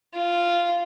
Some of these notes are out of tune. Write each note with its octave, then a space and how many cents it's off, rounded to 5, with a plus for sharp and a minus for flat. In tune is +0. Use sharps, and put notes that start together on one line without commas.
F4 -10